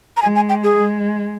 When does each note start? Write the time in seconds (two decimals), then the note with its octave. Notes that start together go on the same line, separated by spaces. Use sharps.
0.17 A#5
0.22 G#3 G#5
0.36 G#5
0.49 G5
0.64 G#4
0.77 G#3